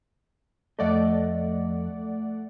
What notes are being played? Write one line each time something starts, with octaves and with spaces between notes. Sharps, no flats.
F2 A3 D5 D#5 F#5